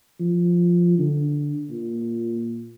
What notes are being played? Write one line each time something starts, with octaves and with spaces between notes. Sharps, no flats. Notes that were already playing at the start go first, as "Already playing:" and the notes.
F3
D3
A#2